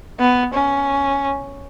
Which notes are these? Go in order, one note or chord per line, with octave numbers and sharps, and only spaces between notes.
B3
C#4